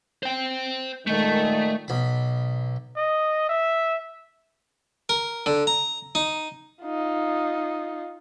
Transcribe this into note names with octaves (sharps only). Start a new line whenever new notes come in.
C5 G5
A#2 D#3 G#3 A3 A4
B1 B5
D#5
E5
A#4
D3
A#5
D#4
D#4 F4